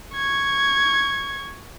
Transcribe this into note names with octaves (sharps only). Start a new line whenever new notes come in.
C#6 G#6